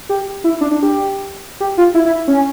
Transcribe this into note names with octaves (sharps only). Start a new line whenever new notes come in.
G4
E4
D4
D4
G4
G4
F4
E4
E4
C#4